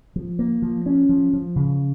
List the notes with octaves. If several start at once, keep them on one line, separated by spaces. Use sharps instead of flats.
F3
A#3
F3
C#4
F3
F3
C#3